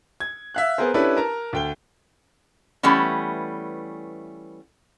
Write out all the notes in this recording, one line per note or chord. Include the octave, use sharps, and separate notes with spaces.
G#6
E5 F5 F#6
B3 G#4 A#4 C5
C#4 D4 E4 G4 A4 B4
A#4 A5 A#5
D2 G5 G7
E3 G3 A3 B3 C#4